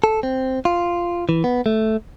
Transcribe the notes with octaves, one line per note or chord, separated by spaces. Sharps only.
A4
C4
F4
E3
B3
A3